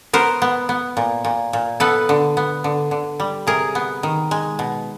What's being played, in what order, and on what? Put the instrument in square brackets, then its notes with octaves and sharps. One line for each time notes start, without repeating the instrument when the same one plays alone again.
[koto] B3 A#4 C5
B3
B3
A#2
A#2
A#2
B3 A4 B4
D3
B3
D3
D3
G3
C3 G#4 A#4
B3
D#3
G#3
B2